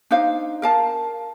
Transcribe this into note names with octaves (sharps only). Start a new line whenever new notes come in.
D4 D#4 C5 F5
A#4 F5 A5